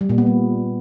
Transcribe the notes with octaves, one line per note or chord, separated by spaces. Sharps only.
G3
A#2
B3
G3